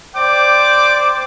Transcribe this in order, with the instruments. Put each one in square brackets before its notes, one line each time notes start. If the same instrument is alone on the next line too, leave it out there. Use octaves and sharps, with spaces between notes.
[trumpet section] C5 D5 G5 D6